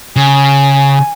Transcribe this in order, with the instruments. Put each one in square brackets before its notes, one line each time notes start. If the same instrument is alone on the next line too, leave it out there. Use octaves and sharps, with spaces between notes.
[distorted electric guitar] C#3 [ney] G#5